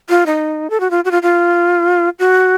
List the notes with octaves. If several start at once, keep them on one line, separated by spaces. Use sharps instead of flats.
F4
D#4
A4
F#4
F4
F#4
F4
F4
F#4